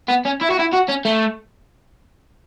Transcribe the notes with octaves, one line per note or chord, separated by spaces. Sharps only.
B3
C#4
E4
F#4
E4
F#4
C#4
A3